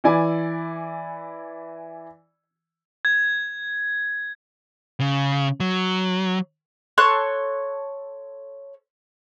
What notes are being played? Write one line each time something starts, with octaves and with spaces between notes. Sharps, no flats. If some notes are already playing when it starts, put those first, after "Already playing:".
E3 E4 D5 G#5
G#6
C#3
F#3
A4 C#5 C6 F#6